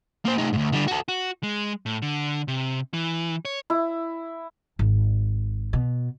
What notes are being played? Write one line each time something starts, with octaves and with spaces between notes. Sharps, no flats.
A#3 C5
A3 D#4
D2 G#2
D3 G3
F#4 A4
F#4
G#3
A2
D3
C3
E3
C#5
E4
G#1
B2